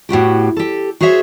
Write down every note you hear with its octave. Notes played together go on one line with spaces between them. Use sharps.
A2 B3 F#4 G4
G4 A4
F#4 G#4 C5 C#5 E5